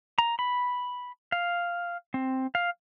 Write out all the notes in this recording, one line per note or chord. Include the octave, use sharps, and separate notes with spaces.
A#5
B5
F5
C4
F5